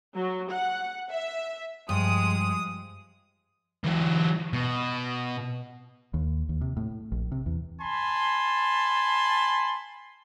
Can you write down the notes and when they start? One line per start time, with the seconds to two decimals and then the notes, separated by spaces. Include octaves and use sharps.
0.16 F#3
0.51 F#5
1.12 E5
1.89 G2 F3 G#3 D#6
3.84 E3 F#3
4.53 B2
6.14 D#2
6.49 D#2
6.61 C3
6.77 A2
7.12 A#1
7.32 C3
7.46 E2
7.81 G#5 A5 B5 C6